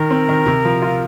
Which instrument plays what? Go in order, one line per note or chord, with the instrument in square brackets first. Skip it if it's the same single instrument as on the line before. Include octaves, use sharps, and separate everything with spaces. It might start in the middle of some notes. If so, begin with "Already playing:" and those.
Already playing: [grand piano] D#3 [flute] A#4
[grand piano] C4
D#3
C3
F3
F4